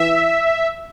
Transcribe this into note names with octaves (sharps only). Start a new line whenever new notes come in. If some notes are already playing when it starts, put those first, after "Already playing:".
Already playing: E3 E5